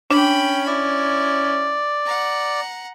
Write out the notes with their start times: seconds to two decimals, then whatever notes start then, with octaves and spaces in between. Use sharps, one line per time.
0.11 C#4 D4 G5 B5
0.66 E4 D5
2.06 F#5 A#5